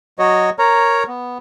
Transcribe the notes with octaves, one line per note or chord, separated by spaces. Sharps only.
F#3 F#4 C#5 D#5
A#4 C#5 A#5
B3